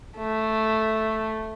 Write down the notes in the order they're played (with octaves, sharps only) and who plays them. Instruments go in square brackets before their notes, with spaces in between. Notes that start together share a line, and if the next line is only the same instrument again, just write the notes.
[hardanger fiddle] A3